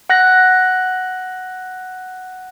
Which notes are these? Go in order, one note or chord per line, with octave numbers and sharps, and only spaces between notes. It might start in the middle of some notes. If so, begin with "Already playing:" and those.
F#5 F#6 A#6